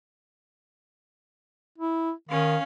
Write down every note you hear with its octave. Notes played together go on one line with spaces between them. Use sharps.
E4
D#3 C#4 F5